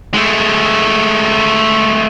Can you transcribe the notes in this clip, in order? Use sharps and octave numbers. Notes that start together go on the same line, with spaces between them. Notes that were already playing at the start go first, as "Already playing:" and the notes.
G#3 A3